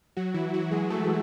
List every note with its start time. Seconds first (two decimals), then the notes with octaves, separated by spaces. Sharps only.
0.17 F#3 F#4
0.34 E3 E4
0.54 F#3 F#4
0.71 G#3 G#4
0.90 A3 A4